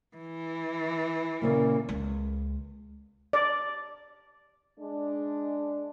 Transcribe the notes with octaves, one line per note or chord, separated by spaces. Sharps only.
E3
A#2 C#3 A#3
C#2
D5
G#3 D4